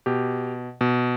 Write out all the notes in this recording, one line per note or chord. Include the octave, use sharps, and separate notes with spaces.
B2 G4
B2